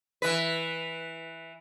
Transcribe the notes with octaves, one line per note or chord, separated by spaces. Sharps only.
E3 B4